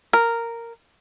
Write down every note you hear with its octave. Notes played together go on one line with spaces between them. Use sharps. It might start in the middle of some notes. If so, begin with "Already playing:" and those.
A#4